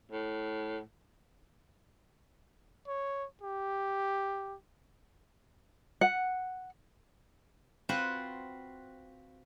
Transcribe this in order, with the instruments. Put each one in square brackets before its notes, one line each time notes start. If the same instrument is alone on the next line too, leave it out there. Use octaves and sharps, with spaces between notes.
[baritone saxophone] A2
[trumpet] C#5
G4
[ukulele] F#5
[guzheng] C4 F4 F#4 B4 C5 F#5